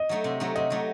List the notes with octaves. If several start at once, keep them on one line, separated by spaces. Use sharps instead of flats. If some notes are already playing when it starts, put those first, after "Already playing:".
Already playing: D#5
F#3 A3 D#4
C3
F#3 A3 D#4
C3 D#5
F#3 A3 D#4